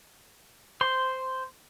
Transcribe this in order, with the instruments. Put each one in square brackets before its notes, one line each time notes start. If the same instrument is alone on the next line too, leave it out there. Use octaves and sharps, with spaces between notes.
[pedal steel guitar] C5 C6